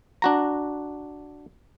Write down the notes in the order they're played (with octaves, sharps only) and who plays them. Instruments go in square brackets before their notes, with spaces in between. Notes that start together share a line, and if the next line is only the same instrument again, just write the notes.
[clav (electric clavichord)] D4 F#4 A#5